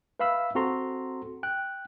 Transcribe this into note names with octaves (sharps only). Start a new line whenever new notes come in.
B4 E5 F5 B5 E6
C4 F#4 A4 A#5 C6
G5 F#6